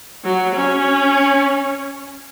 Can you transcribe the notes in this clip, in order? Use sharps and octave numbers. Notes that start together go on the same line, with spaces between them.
F#3
C#4